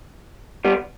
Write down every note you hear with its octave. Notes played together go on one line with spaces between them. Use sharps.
G3 B3